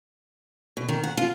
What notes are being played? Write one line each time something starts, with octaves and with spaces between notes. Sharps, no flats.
B2
D#3
F#5
F4